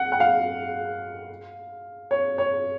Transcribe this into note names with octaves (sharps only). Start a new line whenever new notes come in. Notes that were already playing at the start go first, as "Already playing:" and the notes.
Already playing: F#5
F#5
F5
C#5
C#5